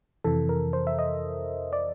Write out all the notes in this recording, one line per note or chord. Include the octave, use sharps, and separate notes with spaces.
F2 C3 E3 A4
A#4
C5
E5
D#5
D5